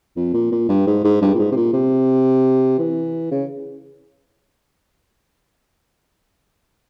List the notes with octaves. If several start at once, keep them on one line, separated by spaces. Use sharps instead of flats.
F2
A#2
A#2
G2
G#2
G#2
G2
A#2
G#2
C3
A#2
C3
E3
C#3